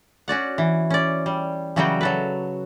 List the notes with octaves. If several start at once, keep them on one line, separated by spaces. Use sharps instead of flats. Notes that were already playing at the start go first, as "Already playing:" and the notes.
C#4 F#4 D5 F#5
E3
C#4 D5
G3
C#3 E3 F#3 G3 F#4 G5
F#3 A4 B4